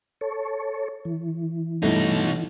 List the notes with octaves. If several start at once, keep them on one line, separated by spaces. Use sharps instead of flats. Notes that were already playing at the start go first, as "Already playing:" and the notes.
A4 C#5
E3
G2 B2 A3 D#4 E4